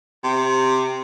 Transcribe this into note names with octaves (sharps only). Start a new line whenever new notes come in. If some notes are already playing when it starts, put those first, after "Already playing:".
C3